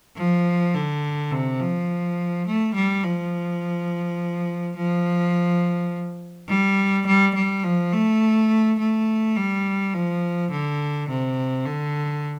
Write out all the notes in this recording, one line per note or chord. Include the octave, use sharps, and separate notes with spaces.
F3
D3
C3
F3
A3
G3
F3
F3
G3
G3
G3
F3
A3
A3
G3
F3
D3
C3
D3